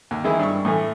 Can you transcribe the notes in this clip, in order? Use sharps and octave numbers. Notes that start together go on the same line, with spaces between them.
D#2
D#3 E3 G#3 E4
G2 C#6
A2 E3 A3